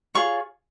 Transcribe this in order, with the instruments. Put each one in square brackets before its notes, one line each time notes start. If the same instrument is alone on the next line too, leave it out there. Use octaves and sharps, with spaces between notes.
[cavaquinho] F4 G#4 C#5 C#6